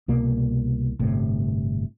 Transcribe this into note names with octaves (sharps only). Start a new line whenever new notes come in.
C2 B2 A#3
G1 A2 C3